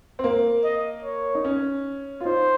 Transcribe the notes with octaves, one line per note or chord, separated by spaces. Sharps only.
C4
A#3
D#5
C#5
D#4
C#4
F4
D#4 C5